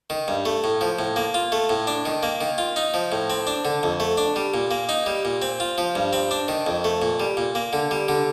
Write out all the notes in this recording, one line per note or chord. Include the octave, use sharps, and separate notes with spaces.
D#3
G2
A3
A2
F3
A2
A#3
F4
A3
A2
D4
D#3
A#3
D#3
F4
D#4
F3
A2
C4
D4
D3
F2
A3
D4
G3
A#2
A#3
D#4
G3
A#2
C4
F4
F3
G2
C4
D4
D#3
F2
A3
A#2
G3
A#2
A#3
D3
G3
D3